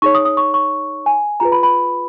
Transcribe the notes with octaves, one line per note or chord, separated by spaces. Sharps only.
D#4 G#4 C#5 C#6
D#6
D#6
C#6
C#6
G#5
F4 G#4 B4 A#5
B5
B5